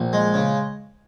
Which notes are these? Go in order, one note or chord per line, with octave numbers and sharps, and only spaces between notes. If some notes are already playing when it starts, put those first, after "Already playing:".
Already playing: A#1
G#3
C#3